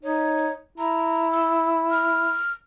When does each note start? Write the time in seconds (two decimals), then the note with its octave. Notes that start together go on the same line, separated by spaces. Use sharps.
0.03 D#4 C#5
0.78 E4 A#5
1.31 E6
1.91 F6